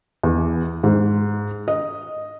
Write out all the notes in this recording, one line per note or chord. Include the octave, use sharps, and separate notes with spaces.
E2
G#2
D#5